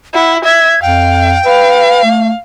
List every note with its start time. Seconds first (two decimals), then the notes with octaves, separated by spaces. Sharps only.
0.14 E4 F#5
0.45 E5 G#6
0.82 F2 F5 G5
1.45 B4 F5
2.04 A3